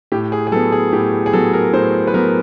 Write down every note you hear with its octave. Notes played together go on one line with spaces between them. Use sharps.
A2 G4
G#4
G#4
F#3 B3 A4
G#4
A2 G4
G#4
F#3 B3 A4
A#4
A2 C5
B4
F#3 B3 A#4